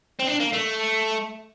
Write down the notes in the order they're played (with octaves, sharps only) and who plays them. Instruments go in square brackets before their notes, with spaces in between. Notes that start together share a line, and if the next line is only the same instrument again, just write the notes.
[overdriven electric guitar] C4
D4
A#3
A3